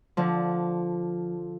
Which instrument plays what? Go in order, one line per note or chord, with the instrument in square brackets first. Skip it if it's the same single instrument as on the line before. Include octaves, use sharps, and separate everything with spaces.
[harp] D3 F3